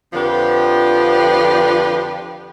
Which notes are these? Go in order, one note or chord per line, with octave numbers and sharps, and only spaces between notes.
F2 D3 F3 G4 B4